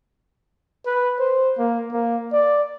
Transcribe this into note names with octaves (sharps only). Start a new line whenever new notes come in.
B4
C5
A#3
A#3
D5